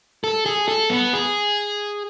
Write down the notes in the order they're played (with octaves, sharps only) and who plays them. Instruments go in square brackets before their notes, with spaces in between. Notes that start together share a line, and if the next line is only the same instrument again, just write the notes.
[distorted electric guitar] A4
G#4
A4
B3
G#4